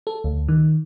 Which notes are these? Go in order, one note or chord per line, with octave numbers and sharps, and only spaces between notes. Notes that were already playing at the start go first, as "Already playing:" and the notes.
A4
D2
D#3